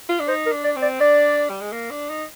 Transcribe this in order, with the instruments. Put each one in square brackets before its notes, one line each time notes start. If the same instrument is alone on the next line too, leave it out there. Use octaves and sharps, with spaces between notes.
[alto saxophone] F4
D4
[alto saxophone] D#4 [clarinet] C5
[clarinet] A#4
[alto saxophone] D4
[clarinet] D5
[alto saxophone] C4
[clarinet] D5
[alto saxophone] D4 [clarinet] D5
[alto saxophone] G3
G#3
A#3
D4
D#4